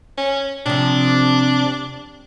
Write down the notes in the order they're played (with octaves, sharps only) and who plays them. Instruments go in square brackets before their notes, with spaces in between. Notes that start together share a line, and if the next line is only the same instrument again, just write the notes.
[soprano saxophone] C#4
[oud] C3 F3 [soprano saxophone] D4